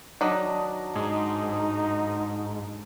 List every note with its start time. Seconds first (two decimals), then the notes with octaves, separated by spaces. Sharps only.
0.21 D#3 F#3 D4 D#5
0.95 G#2 D#4 G#4